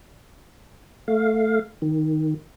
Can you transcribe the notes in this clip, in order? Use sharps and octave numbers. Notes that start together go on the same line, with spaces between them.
A3 F5
D#3